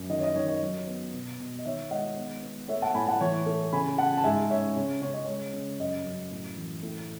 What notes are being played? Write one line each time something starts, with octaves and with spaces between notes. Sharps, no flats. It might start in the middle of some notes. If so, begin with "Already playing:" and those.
Already playing: F#2
D#3 D#5
C#5
D#5
D#3 C#5
D#5
F#3
B3
B2
B2
D#5
D#3 C#5 E5
G#3 D#5 F#5
B3
B3
A3 C#5 E5
F#5 A5
A2 G#5 B5
F#5 A5
E3 C#5
A3
C#3 G#5 B5
C#3 F#5 A5
A5
G#2 E5 G#5
C#4 C#5 E5
C#3 C#5
C#3 C#5
D#5
G#3 C#5
C#3
F#2 D#5
F#2
A2
E3
A2